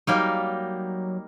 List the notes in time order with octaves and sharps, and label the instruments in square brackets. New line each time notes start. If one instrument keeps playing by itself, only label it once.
[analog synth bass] F#3 [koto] G3 A#3 D#4